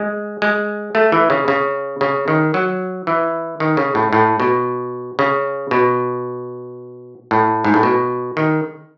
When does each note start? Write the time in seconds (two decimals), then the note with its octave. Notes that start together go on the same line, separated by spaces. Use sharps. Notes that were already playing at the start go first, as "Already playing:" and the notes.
Already playing: G#3
0.42 G#3
0.95 A3
1.12 E3
1.30 C#3
1.48 C#3
2.01 C#3
2.28 D#3
2.54 F#3
3.07 E3
3.60 D#3
3.77 C#3
3.95 A2
4.13 A2
4.40 B2
5.19 C#3
5.71 B2
7.31 A2
7.65 G#2
7.74 A2
7.83 B2
8.37 D#3